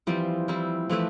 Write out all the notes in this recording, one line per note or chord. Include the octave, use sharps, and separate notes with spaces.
E3 F3 G3 C4
G3 C4 E4
E3 F3 A3 E4 B4